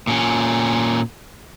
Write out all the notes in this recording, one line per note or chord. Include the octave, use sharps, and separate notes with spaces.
A#2 C#4